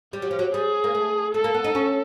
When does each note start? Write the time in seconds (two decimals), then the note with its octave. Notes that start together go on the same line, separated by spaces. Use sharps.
0.13 G3 G4
0.22 F#3
0.31 F3
0.39 F#3
0.54 G3 G#4
0.84 A#3
0.95 A3
1.34 A3 A4
1.44 A#3
1.54 B3
1.64 D#4
1.75 C#4